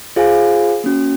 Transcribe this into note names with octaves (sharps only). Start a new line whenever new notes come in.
F4 G#4 C5 F5 G#5
A#3 C#4 F#4